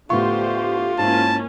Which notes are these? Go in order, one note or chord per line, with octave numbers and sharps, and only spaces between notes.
A2 D3 B3 F4 G4 C5 C#6
G#2 A#3 C#4 E4 A5